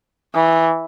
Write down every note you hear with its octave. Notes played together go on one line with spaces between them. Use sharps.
E3